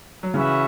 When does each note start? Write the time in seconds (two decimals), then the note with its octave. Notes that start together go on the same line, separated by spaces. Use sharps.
0.23 F#3
0.34 C#3 E3 C#4 F#4 B4 E5